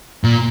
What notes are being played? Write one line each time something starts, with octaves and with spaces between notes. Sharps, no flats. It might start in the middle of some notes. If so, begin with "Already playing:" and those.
A#2